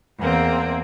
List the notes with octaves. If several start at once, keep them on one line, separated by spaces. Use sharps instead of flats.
E2 A#3 C4